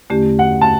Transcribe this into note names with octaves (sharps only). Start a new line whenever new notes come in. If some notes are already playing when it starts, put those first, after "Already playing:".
E2 D3 A3 C#4 G4
F#5
A5